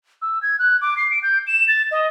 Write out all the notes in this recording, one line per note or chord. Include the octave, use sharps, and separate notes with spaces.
E6
G#6
F#6
D6
C7
D7
G6
E7
A6
D#5